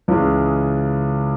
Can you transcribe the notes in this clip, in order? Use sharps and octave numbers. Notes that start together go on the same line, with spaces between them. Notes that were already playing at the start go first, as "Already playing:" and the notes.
C#2 C#3 E3 G#3